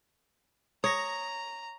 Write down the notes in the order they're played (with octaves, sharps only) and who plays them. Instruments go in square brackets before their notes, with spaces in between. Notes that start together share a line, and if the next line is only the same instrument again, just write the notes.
[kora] C#5 [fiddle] A#5 [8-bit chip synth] D#6 A#6